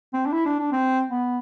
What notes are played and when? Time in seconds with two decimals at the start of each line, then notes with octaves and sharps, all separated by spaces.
0.13 C4
0.26 D4
0.32 E4
0.45 D4
0.59 D4
0.72 C4
1.11 B3